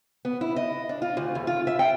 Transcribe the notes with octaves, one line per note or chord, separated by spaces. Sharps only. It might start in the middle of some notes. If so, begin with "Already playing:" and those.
B3
E4
D#5
D4
F4
D2
E2
F4
E5
G5